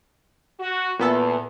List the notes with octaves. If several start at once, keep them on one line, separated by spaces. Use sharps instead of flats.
F#4
E2 A#2 B3 A4